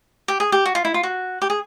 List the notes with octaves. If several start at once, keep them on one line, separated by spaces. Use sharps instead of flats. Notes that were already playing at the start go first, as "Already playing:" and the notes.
G4
G#4
G4
F#4
F4
E4
F4
F#4
G4
G#4